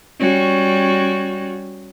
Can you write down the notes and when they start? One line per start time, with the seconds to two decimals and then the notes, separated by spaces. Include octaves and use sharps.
0.19 G3 C#4 F#4